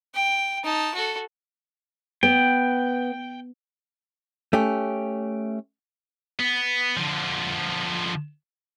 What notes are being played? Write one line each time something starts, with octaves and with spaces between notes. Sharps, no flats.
G5
D#4 A5
F#4 A4
B3 G5
A3 C#4 G4
B3
D3 F3